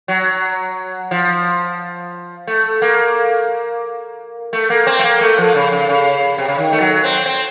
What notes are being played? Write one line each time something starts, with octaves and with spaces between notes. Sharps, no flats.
F#3
F3
A3
A#3
A3
A#3
C4
A3
A#3
A3
F3
C#3
C#3
C#3
C3
C#3
D#3
A3
F#3
C4
C4